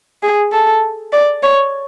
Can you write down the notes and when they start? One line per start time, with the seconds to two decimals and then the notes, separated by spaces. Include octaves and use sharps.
0.23 G#4
0.53 A4
1.13 D5
1.43 C#5